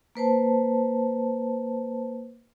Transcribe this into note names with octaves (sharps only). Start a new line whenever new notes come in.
A#3 B4 C5 A5